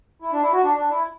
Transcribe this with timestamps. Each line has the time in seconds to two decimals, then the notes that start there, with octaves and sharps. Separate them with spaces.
0.22 E4
0.32 D4
0.43 E4
0.53 F#4
0.63 D4
0.77 D4
0.91 E4